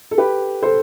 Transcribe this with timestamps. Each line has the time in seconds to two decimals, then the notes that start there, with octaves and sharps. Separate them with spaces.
0.11 A4
0.18 G4 B4
0.62 A4 C5